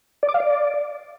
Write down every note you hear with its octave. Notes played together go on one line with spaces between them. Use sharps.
D5
D6
F5
D5